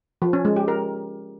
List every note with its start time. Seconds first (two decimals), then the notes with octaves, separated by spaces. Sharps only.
0.22 F3
0.33 C#4
0.45 G#3
0.56 G4
0.68 A#4